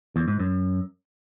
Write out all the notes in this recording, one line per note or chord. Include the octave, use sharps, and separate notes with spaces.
E2
G#2
F#2